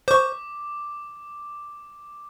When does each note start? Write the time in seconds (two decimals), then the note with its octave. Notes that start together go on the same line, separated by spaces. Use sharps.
0.08 C5 C#6 D6